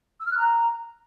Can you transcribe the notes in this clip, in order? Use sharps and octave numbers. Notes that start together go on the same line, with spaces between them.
E6
F6
F#6
A#5